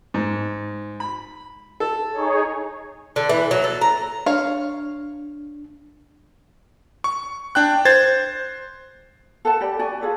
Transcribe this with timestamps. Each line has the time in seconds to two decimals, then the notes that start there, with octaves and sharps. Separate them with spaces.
0.14 G#2
1.00 B5
1.80 A4
2.12 D#4 G#4 C#5
3.16 D3
3.29 E3
3.51 F#3
3.64 A4
3.81 A#5
4.26 D4 C#5 F5
7.04 C#6
7.55 D4 G5 F#6
7.85 C5 G#6 A6
9.45 A4 B4 F#5 A5
9.61 G4 D5 B5
9.79 F#4 D5 G#5
10.01 F4 G#4 A4 B4